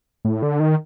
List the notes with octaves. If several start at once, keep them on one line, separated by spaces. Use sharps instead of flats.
A2
D3
D#3